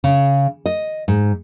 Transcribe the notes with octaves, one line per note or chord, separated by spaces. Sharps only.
C#3
D#5
G#2